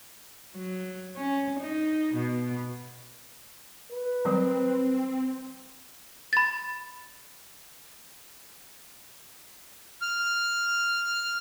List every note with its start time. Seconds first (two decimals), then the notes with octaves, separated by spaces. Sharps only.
0.55 F#3
1.17 C#4
1.59 D#4
2.14 B2
3.92 B4
4.25 D#3 F#3 G3 C4
6.33 B5 A6
10.02 F6